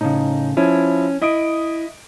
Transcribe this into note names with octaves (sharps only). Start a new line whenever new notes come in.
A2 C#3 D#4
F3 C#4 E4
E4 D#5 D#6 D7